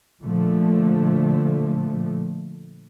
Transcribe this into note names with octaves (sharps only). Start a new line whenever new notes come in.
A#2 D3 F3 A3